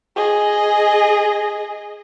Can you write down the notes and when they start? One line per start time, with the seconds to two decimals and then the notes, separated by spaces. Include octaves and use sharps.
0.16 G#4 D#5